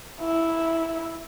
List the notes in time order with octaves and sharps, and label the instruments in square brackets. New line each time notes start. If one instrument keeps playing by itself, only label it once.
[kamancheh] E4